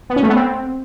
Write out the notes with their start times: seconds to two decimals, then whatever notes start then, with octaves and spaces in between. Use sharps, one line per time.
0.10 B3
0.16 C#4
0.23 A3
0.29 B3
0.36 C4